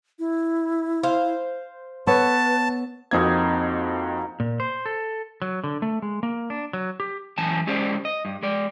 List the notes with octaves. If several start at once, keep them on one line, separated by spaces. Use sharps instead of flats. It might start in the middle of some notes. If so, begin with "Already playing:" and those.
E4
C5 F5
B3 A4 B4 C#5 A5
F2 A#3 C4 D#4 F#4 G#6
A#2
C5
A4
F#3
D3
A3
G#3
A#3
D4
F#3
G4
F#2 E3 G#5 A5
G#3 C#4 G4 G#4 C5 D5
D#5
G2
G#3 D5